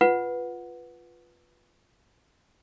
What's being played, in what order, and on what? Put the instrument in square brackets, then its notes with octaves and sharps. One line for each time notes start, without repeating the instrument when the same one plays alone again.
[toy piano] F4 B4 F#5